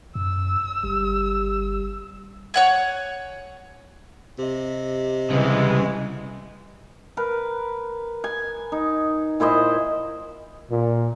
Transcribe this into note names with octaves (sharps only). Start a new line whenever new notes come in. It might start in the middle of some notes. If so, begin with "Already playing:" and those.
F#2 E6
G1 G3
C#5 F#5 G#5
C3 G4 D#5
C2 C#3 E3 G#3
A#4 B4
G#5
D#4
A#2 E4 C5 D#5
A#2